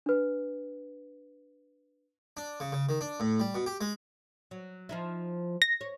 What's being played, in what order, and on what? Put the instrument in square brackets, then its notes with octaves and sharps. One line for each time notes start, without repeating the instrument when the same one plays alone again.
[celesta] D4 B4
[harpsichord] D4
C#3
C#3
D#3
D4
A2
G3
B2
G4
G#3
[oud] F#3
F3 D#4 E4
[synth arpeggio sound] A#6
[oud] C#5